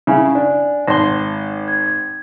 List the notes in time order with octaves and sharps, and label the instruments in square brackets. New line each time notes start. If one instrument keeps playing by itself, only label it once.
[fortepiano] C#3 E4 [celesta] F5 G#5
[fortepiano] D4
[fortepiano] G#1 A5 C6 [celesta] A#6 G7
[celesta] G#6